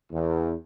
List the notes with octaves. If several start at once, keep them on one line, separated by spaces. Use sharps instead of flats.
E2